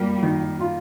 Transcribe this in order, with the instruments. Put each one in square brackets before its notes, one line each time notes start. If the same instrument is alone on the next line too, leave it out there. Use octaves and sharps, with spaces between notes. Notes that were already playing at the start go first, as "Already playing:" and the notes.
Already playing: [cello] G3 [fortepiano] A#3
[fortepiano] D#3
F4